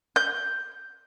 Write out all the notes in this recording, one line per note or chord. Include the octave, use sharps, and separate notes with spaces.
G6